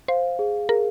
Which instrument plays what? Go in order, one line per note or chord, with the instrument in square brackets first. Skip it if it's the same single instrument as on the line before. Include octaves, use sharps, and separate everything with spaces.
[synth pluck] C5 [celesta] F5
[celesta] G#4
[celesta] G#4 [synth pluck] A#4